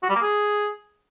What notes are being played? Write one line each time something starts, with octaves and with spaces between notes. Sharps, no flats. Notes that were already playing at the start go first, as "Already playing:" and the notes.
F#4
G3
A#3
G#4